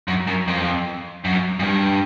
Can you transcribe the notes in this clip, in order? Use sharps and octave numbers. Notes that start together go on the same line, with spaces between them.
F#2
F#2
F2
F#2
F#2
G2